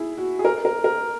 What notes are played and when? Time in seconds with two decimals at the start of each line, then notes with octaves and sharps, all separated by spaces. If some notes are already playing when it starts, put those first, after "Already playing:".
Already playing: E4 G#4
0.18 F#4
0.39 G#4
0.45 A#4
0.65 A#4
0.84 A#4